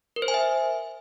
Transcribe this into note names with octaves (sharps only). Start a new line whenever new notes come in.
A#4
C5
G#5
E5